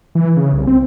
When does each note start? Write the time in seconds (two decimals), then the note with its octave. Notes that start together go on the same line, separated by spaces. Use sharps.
0.15 E3
0.37 C#3
0.53 C2
0.67 C4